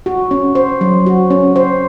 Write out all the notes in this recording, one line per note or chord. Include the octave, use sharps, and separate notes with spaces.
F#4
C#4
C5
F#3
F#4
C#4
C5